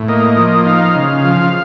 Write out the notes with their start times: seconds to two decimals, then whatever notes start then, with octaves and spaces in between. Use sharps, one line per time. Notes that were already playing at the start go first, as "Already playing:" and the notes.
Already playing: A2
0.08 A#3 D#5
0.37 F3
0.66 D#4 F5
0.95 C#3
1.24 F3